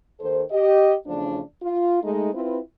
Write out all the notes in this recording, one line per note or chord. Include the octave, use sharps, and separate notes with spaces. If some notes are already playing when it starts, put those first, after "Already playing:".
D#2 D#3 A4 C5
G4 D#5
E2 C#3 F3 A3 D4
F4
G#3 A3 D#4
C4 E4 F4 B4